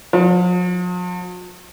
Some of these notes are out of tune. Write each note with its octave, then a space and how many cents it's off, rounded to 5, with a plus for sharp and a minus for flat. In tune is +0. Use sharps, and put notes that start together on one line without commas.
F3 +45